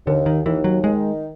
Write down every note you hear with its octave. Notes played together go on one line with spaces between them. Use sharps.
D#2 D3
D#3
D#2 E3
F#3
D#3 G#3